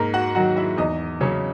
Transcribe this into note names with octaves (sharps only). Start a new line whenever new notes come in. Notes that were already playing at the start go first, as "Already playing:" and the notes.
Already playing: G#2 A#3 A#4
F#4 F#5
D#3 F#3 F#4 F#5
E4 E5
E2 D#4 D#5
C#3 F#3 C#4 C#5